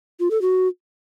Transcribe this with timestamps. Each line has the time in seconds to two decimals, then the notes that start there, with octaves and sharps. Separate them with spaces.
0.20 F4
0.31 A4
0.42 F#4